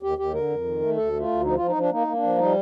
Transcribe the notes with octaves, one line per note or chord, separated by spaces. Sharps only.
D#2 G4
D#2 G4
D3 A#4
F2
D#3
A3
D2 A4
A3
F4
D2
F3 D#4
F3 F4
D#4
F3 D4
A#3 D#4
A#3
D4
F3
G3 D#4